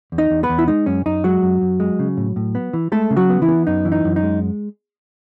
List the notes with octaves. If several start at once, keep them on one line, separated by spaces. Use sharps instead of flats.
E2
D#4 D#5
E2
B3 B4
E2
E4
G#3 D#4
F#2 C#4
F#2 D#4
F#3 G#3 F#4
F#2
F#2
G#3
C#3
A2
A2
B3
E3
G#3 A3 A4
C#3
F#3 F#4
B3
E3 E4
B3
F#2 D#4
E3
D#4
F#2
D#4
G#3